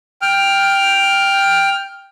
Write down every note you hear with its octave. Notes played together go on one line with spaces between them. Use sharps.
G5 F6